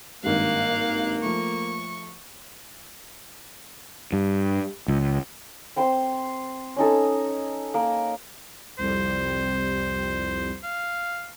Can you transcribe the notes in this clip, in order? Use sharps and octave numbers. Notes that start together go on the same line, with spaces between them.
G#1 G2 A#3 F5 F#6
F3 A3 C#6
G2
C#2
C4 C5 C6
C#4 D#4 A4
A#3
C2 F2 G3 C5
F5